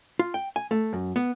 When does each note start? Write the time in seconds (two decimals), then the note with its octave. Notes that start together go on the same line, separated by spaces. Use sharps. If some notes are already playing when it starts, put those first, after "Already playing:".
0.19 F4
0.34 G5
0.56 G#5
0.71 A3
0.93 F#2
1.16 B3